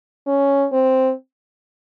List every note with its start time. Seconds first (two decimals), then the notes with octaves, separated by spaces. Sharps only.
0.27 C#4
0.72 C4